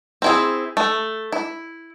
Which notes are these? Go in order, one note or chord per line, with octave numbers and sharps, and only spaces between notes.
C4 E4 G#4
A3
E4